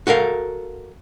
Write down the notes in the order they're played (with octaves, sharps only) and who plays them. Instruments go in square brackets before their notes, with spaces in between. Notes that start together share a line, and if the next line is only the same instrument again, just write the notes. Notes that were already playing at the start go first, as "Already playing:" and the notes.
[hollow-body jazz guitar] F#4 A4 A#4 F5